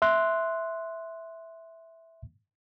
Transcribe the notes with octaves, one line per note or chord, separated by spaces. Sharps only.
E5 C6 F#6